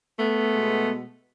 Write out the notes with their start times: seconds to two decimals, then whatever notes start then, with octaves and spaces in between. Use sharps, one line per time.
0.19 A3 B3
0.53 B2 G#3